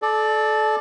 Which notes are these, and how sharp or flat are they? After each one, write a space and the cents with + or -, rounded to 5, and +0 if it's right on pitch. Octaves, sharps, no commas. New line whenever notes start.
A4 -25 D5 +15